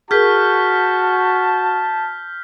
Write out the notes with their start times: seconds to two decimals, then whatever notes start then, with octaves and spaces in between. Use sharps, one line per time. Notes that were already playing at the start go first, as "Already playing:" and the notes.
0.11 F#4 G#4 A#4 A5 F6 G6 B6